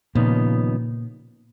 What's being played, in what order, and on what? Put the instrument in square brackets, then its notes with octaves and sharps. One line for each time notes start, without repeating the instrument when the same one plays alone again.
[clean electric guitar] D#2 C#3 F3 B3 D#4 [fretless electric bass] A#2